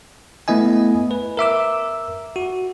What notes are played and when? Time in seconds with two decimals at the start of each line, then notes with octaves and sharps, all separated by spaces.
0.48 A3 B3 E4 D#5 G#5
1.11 B4
1.37 A#4 E5 D6 E6
2.36 F#4